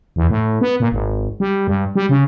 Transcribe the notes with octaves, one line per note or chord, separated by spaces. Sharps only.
E2
A2
B3
A#2
G#1
G3
G2
G3
C#3